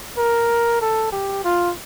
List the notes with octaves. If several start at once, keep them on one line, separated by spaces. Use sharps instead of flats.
A#4
A4
G4
F4